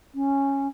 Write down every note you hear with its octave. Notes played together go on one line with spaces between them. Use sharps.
C#4